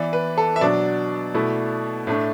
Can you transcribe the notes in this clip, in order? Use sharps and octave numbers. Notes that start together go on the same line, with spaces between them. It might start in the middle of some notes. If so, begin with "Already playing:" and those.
Already playing: E3 B3 E4 D5
B4
A4
E5
B2 F#3 D4 D5
B2 A3 E4
A2 A3 D4